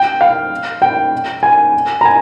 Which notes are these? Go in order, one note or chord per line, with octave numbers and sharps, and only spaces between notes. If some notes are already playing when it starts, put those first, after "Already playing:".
Already playing: G5
F5
G5
G#5
A#5
G#5